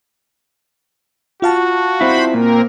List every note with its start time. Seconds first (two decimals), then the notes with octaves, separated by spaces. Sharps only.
1.42 F4 F#4 F5 A5
2.01 C4 E4 C5 B5
2.34 A#2 A#3 C4 A#4